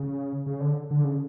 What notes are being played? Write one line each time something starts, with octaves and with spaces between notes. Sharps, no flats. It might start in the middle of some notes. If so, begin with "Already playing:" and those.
Already playing: C#3
C#3
D3
D3
C#3